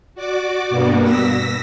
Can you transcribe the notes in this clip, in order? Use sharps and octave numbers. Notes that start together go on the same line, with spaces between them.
F#4 D5 D6
G2 B2 A#3 B3 F#4
E6 A#6 B6